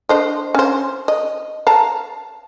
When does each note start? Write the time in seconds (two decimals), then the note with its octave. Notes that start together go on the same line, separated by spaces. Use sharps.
0.09 D4 C5 D#5
0.55 C#4 C5
1.08 D#5
1.67 F5 A5 A#5